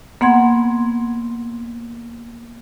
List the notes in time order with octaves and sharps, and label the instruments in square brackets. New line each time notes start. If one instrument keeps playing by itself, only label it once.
[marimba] A#3 B3 F#5 C6 G#6